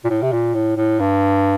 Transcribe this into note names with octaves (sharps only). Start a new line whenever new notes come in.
A#2
A2
C3
A#2
A2
A2
G2